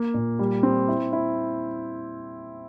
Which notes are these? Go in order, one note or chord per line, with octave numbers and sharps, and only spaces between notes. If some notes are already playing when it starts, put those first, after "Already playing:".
Already playing: A#3
A#2
G3
C4
E4
E4